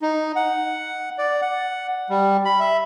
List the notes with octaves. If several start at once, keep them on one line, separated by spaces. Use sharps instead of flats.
D#4
F#5
D5
F#5
G3
B5
E5